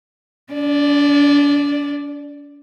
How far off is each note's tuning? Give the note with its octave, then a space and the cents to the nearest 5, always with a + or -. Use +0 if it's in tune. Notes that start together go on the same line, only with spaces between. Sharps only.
D4 -40 D5 +5